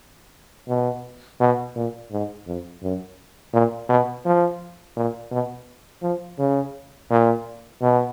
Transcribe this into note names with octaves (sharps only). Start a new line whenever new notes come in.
B2
B2
A#2
G#2
F2
F#2
A#2
B2
F3
A#2
B2
F3
C#3
A#2
B2